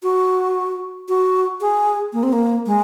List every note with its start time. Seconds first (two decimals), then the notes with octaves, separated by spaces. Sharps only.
0.03 F#4
1.08 F#4
1.61 G#4
2.13 A#3
2.23 C4
2.32 A#3
2.66 G#3